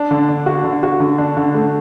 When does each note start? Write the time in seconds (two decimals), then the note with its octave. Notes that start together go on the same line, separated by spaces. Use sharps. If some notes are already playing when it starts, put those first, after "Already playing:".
Already playing: D4
0.11 D3
0.28 D4
0.46 F#4
0.64 D3
0.83 F#4
1.00 D3
1.18 D4
1.37 D3
1.55 A3